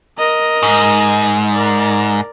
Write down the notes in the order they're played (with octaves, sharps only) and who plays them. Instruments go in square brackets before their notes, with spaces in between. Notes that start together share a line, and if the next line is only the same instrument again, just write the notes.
[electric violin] A#4 D#5
[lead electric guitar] G#2
[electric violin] A#4 D5